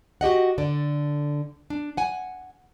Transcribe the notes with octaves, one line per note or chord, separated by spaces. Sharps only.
F#4 G4 D#5 F#5
D3 A4 D5
D4
F#5 G#5